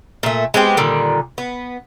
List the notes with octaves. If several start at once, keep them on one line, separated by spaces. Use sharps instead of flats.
A#2 A3
G#3 B3 C4 G4
A#2 D3 D#3 G3
B3